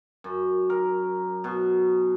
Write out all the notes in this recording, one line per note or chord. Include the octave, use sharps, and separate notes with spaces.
F#2
A#4
B2